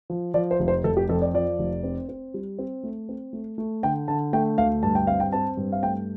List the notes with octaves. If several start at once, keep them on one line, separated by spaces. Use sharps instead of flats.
F3
F3 D5
C5
F1
C5
F1 A4
G4
F2 A4
D5
F3 D5
F1
C4
C4
G3
C4
A3
C4
A3
A3
D3 G5
D3 A5
A3 G5
D2 F5
G2 A5
G5
C4 F5
G5
C4 A5
G2
F5
A3 G5